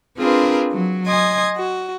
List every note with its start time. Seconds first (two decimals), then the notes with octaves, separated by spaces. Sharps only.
0.18 C4 D4 F4 G#4 A#4 B4
0.72 F#3
1.07 D#5 G#5 C6 D#6 G#6
1.55 F#4